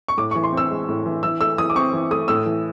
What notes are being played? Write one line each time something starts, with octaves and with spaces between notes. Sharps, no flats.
C#6
A2 D6
C#6
E3
C6
C4 E6
G#3
A2
E3
E3 E6
A3 E6
E3 D#6
D6
C4 C#6
E3
A3 D#6
A2 E6
E3